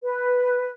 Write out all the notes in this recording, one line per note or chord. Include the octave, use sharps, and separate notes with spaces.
B4